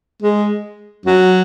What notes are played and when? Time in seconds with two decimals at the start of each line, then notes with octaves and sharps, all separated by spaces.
0.23 G#3
1.06 F#3